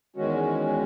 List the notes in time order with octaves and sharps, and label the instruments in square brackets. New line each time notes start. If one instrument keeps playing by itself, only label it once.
[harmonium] E2 D#3 G#3 C#4 F#4